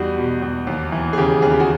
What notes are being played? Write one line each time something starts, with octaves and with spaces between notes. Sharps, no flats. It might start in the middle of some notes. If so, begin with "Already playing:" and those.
Already playing: E2 G3 D#4 F#4
B2
E2
D#2
E3
G#4
C#3 G4
D#2 G#4
G4
F#4